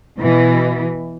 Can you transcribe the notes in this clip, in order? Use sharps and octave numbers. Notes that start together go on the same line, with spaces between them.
B2 E3